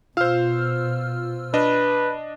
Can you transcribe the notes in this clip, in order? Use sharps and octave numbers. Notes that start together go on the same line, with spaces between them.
B2 F4 C5 F5 E6 F6
D4 B4 D#5